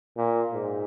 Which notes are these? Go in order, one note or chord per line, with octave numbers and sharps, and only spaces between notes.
A#2
G#2